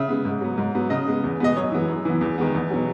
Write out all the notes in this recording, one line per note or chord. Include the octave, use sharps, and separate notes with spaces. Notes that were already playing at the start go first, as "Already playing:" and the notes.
Already playing: C#3 E5
G#3 B3
G#2
F#3 B3
G#2
F#3 B3
C#3 D#5
G#3 B3
E2
B2 G#3 B3 D#5
F#2 C#5
E3 G#3 B3
F#2
E3 B3
E2
D#3 G#3 B3
E2
B2 F#3